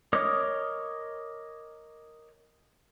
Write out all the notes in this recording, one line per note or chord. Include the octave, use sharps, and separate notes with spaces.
A#4 C#5 D#5 D6 D#6